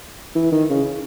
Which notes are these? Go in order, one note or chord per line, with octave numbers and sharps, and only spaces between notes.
E3
D#3
C#3